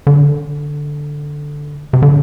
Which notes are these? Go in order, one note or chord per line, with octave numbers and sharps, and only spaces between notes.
D3
C3
D3